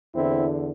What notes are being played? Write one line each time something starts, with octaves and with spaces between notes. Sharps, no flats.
E2 D3 C4 E4